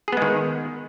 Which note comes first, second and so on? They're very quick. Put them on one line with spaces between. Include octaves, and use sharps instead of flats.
G#4 B3 G#3 D#3